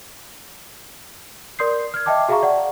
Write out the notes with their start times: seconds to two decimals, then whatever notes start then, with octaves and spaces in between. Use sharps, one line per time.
1.59 A#4 D5 C6 D#6 G6 C7
1.94 F6 G#6
2.06 D#5 E5 G5 A5 D6
2.28 F#4 G#4 E5 F5 A#5 C#6
2.43 D5 F#5